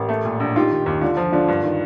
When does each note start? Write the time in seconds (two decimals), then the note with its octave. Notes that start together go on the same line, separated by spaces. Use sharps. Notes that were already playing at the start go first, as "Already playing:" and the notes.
Already playing: A1 G4 A#4
0.09 A3
0.25 A#2
0.40 A#1
0.56 D#4 F4 G4
0.70 D#3
0.86 D#2
1.01 D3 D4 F4
1.17 F3
1.32 D3 D4 F4
1.48 G2
1.64 D#3